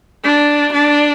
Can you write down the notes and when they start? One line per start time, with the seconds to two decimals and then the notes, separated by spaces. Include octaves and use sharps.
0.25 D4
0.74 D4